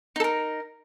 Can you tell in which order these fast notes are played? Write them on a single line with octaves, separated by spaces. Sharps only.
D#4 A4 A#4